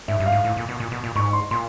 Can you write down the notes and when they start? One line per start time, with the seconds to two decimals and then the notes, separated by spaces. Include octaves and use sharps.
0.08 G#2 E5
0.20 G2
0.26 F5
0.32 G#2
0.44 A2
0.57 A#2
0.68 B2
0.80 A#2
0.92 B2
1.04 A#2
1.16 G#2 C#6
1.33 C6
1.51 A#2 C6